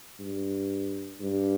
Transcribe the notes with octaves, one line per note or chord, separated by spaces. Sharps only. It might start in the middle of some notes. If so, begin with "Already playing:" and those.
G2
G2